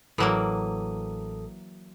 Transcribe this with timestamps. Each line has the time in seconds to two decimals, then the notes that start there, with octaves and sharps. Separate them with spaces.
0.18 A1 E3 F#3 A#3 A4 D#6